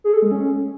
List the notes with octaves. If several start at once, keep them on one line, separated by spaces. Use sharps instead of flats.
G#4
A4
G#3
C#4